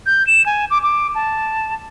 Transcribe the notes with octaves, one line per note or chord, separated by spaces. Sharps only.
G6
E7
G#5
D6
D6
A5